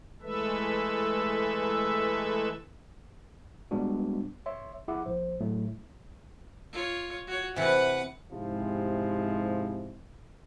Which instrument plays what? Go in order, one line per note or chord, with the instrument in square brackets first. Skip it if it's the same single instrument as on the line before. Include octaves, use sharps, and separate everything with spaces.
[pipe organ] E3 G#3 A3 A4 B4 E5
[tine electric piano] A#2 G3 G#3 B3 D4 F#4
C#5 E5 C6
A#1 E4 G#4 E5 F#5 D6
A#1 C5
A2 F#3 A3
[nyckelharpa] F4 C#5
F#4 C#5
[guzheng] C3 E3 [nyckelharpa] B4 F#5
[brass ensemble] G#2 C3 F3 G#3 E4 G4